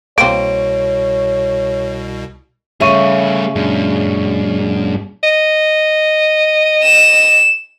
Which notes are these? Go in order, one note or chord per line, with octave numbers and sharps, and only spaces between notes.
C2 B2 A#3 C4 C#5 D7
C#3 G3 A3 E5 C#6 D#7
F#2 A#2 G#3 D4
D#5
E7